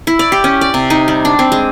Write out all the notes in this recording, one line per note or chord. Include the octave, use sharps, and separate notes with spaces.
E4
D5
G4
C#4
D5
C3
D#4
G3
D4
C4
G#3